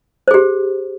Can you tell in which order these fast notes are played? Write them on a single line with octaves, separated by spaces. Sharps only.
C5 G#4 G4